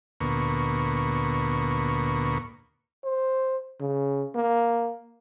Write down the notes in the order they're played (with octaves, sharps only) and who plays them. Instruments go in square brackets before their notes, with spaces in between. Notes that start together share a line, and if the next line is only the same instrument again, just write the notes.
[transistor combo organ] D2 A#2 A#3 B3 C#6
[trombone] C5
C#3
A#3